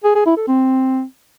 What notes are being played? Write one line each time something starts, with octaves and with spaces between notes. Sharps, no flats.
G#4
G#4
E4
A4
C4